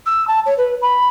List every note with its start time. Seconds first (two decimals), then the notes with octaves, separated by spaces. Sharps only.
0.05 E6
0.27 A5
0.45 C#5
0.57 B4
0.81 B5